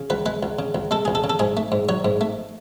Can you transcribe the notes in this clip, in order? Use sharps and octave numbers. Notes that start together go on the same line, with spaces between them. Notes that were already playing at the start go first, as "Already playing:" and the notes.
Already playing: C#3
C#2 B4
G#3 B4
C#2
C#3
C#2
G#3 A4
C#2 G#4
A4
C#3
A4
G#2 G#4
A3
G#2
F#3 C#5
G#2
A3